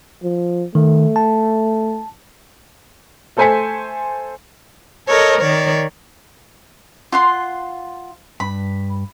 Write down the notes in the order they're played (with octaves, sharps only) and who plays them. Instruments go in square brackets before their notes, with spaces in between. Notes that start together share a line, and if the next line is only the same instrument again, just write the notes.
[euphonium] F3
[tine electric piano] D#3 [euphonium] A3
[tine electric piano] A5
[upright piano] A3 A4 C5 G#5 B6 C#7
[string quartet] A4 A#4 C#5 D#5
D#3 C#5 D5
[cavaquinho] F4 F#5 C6
[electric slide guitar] G2 [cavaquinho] B5